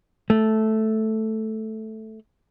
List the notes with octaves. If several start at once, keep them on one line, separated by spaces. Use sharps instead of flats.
A3